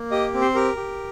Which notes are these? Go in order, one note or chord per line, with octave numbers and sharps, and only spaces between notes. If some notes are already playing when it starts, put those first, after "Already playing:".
Already playing: A#3
G4 D#5
C4
C5
G4 A#4
G4